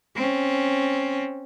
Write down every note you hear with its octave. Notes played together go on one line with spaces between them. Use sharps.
C4 C#4